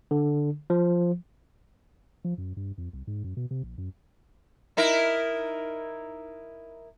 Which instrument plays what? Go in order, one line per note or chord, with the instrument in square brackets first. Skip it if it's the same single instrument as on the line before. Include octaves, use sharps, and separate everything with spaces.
[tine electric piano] D3
F3
[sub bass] F3
F#2
G2
F2
C2
G#2
F#2
B2
C3
A#1
F#2
[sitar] D#4 E4 A#4